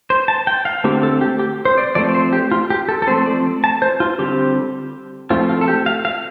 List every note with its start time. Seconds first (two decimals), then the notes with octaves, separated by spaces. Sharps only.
0.10 C5
0.28 A5
0.47 G5
0.65 F5
0.84 D3 A3 C4 G4
1.03 A4
1.21 G4
1.39 G4
1.65 C5
1.78 D5
1.95 F3 A3 C4 D5
2.15 C5
2.33 G4
2.52 F4
2.70 G4
2.89 A4
3.02 A4
3.07 F3 A3 C4 C5
3.26 D5
3.64 A5
3.82 C5
4.00 F4
4.19 D3 G3 C4 G4
5.30 F3 A3 C4 F4
5.49 F4
5.61 A4
5.68 G4
5.86 F5
6.05 F5